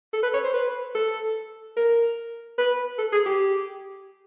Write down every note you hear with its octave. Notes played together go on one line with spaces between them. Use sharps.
A4
B4
C#5
C5
B4
A4
A#4
B4
A4
G#4
G4